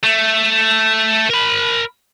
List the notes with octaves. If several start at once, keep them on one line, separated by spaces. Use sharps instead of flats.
A3
A#4 B5